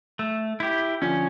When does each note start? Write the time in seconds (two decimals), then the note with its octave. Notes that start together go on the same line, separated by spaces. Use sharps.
0.19 A3
0.60 E4 G4
1.02 D3 F3 C#4